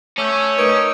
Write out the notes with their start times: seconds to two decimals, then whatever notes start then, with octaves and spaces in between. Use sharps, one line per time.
0.18 A3 C#4 D6 E6 G6
0.58 A3 D#4 A#4 B4 C#6 G#6 D7